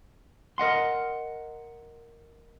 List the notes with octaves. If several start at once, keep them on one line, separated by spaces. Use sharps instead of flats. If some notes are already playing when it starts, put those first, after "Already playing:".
A#4 D#5 F#5 C6